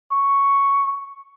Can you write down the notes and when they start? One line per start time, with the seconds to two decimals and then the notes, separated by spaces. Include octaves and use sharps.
0.12 C#6